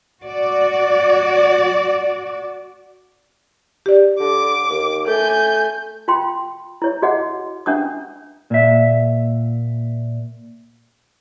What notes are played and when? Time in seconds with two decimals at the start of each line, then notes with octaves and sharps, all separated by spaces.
0.22 F#4 D5
3.86 G4 D5
4.20 D3 D6
4.70 D#2
5.07 A3 G#5 G6
6.08 F4 G5 C6
6.82 E4 C#5
7.02 F#4 G#4 D#5 F#5
7.66 C#4 D4 F#5 D#6
8.50 A#2 E5